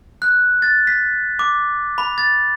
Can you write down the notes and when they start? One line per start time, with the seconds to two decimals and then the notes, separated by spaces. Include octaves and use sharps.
0.22 F#6
0.62 A6
0.87 B6
1.39 D6
1.98 B5
2.18 A6